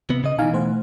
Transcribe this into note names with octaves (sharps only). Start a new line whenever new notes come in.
C3 B3
C#3 D#5
B2 E3 D#4 F5 G#5
A3 C5 F#5